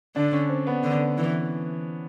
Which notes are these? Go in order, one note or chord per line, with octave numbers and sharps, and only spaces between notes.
D3 D4
C#4
C4
B3
D3
E3